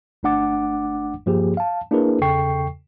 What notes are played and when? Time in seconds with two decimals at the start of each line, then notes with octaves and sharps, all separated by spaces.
0.23 G1 A3 D4 F#5 D6 A6
1.26 G2 F3 A#3 G4 G#4
1.57 F5 A5
1.91 A#3 D4 E4 G#4 A#4 B4
2.22 E2 C#3 A4 G5 C#6 C7